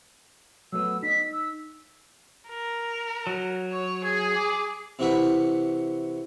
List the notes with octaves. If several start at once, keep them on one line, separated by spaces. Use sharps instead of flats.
F#3 A3 B3 E6
D#4 D#5 B6
E6
A#4
F#3
C#5
G#4 G#6
D6
C3 E3 F#4 B5